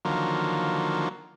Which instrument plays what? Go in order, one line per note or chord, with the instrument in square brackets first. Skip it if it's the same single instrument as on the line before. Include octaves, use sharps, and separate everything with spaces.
[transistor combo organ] D3 D#3 F3 F#3 A#3